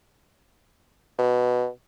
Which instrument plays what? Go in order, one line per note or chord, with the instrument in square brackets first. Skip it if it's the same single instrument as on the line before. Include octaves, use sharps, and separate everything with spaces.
[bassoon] B2